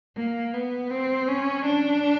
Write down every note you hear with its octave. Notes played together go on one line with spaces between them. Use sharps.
A#3
B3
C4
C#4
D4